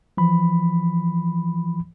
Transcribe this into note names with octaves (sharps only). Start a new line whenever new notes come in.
E3 F3 B5